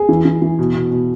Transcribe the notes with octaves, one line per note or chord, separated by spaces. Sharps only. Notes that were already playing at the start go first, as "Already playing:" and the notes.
Already playing: G#4
E3
E3
E3
B2
B2
B2